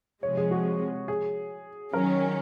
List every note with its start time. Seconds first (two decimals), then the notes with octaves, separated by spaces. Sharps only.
0.23 C3 F3 G#3 C#5
0.37 G#4
0.51 F#4
1.08 G#4
1.93 D#3 F#3 C#4 A#4